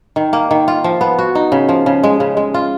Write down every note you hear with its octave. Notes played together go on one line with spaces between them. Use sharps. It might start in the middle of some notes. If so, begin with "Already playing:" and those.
D#3
A#3
D#3
F4
F3
B3
F#4
D#4
C#3
F3
C#3
G#3
C#3
G#3
F4